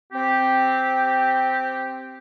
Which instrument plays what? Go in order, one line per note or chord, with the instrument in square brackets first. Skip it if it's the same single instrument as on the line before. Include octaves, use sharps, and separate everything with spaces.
[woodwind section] C4 G4